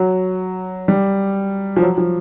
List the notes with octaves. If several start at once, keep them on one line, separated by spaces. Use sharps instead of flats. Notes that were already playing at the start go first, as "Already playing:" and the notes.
Already playing: F#3
G3
F3
F#3
F3